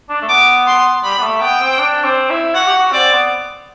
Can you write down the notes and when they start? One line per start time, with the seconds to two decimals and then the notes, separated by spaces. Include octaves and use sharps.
0.10 D4
0.22 A3
0.28 B3 D6
0.67 C6
1.04 G3 B5
1.18 B3
1.23 A3
1.41 B3 G5
1.61 C4
1.79 D4
2.05 C4
2.30 E4
2.55 F#4 F#5
2.67 G4
2.73 F#4
2.92 C4 D5
3.12 B3